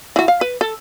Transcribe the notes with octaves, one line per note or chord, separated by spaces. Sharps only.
E3 F#4
F5
B4
A4